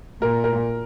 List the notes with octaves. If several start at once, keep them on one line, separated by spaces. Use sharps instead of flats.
A#2 A#4
A#4